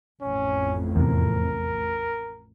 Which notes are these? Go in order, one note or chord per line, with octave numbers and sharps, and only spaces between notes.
A1 F2 A2 C#4
E2 C3 A#4